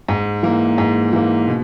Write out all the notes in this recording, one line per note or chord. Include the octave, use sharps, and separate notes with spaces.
G#2
E3 A#3
G#2
E3 A#3
B2